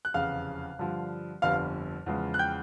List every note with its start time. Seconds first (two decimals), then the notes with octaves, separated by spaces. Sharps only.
0.05 F#6
0.14 F1 E2 C#3 F5 F6
0.79 G2 D3 F3
1.42 G1 F2 D3 G3 B3 F5 F6
2.06 E2 C#3 F3 G#3
2.34 F#6
2.39 G5 G6